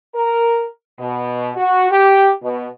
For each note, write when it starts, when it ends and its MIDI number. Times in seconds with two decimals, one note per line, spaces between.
0.15 0.66 70
0.99 1.50 47
1.56 1.89 66
1.91 2.31 67
2.43 2.67 47